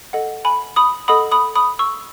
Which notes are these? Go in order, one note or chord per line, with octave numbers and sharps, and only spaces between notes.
A4 D#5 F#5
G#5 B5
B5 D#6
A4 D#5 F#5 B5 D#6
B5 D#6
B5 D#6
C#6 E6